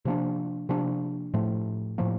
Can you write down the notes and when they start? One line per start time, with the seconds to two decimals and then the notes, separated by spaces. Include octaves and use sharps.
0.05 C3 F3 A#3 D4
0.69 C3 F3 A#3 D4
1.34 A2 F3 A3
1.98 A2 F3 A#3